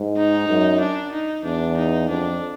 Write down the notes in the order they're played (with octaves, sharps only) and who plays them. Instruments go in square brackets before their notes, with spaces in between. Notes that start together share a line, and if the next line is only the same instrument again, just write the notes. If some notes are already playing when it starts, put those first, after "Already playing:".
Already playing: [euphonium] G#2
[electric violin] D#4
[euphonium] F#2
[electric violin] D4
D#4
[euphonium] E2 [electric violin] D4
[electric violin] D#4
[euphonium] F2 [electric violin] D4